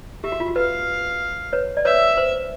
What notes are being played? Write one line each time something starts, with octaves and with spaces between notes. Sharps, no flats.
G4 E5
F#4
F4
F#4
B4 F5
B4 C#5
D5
B4 C#5 E5
C5